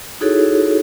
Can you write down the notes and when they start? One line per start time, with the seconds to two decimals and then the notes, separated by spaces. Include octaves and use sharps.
0.21 D#4 E4 F#4 G#4 A4 C#5